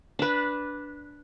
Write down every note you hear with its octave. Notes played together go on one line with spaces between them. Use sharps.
D4 B4